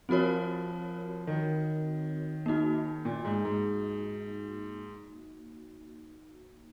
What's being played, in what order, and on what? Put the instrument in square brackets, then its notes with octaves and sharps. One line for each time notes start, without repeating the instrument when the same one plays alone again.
[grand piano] F3 [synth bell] C4 F#4 A#4 C#5
[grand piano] D#3
[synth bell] A#3 D#4 F#4
[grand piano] A#2
G#2
G#2